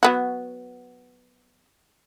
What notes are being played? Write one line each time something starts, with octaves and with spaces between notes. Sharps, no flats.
F#3 B3 F#4